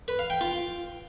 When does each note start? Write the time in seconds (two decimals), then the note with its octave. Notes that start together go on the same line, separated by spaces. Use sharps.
0.08 B4
0.19 F5
0.30 G5
0.41 F4